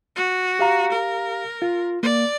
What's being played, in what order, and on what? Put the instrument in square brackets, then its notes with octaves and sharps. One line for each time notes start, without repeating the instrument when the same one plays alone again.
[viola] F#4
[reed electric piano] G4 F5 A#5
[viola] A#4
[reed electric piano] F4
[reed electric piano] A#3 [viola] D5